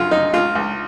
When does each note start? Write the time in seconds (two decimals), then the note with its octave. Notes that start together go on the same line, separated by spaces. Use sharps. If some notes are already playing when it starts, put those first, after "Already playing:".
Already playing: F#2 F4
0.11 F#2 D#4
0.33 C#2 F4
0.55 C#2